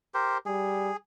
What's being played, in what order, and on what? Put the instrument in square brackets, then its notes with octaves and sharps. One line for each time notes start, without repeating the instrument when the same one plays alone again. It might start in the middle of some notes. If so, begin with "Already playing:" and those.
[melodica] G4 A#4 C5
[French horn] G3 [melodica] G#4